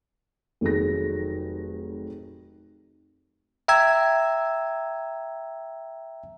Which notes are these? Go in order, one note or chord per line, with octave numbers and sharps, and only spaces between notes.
F1 D#3 F#3 G#4 A#6
E5 G5 A#5 E6 G#6